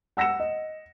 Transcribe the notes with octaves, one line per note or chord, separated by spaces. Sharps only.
F#5 E6 A#6 C#7 E7
D#5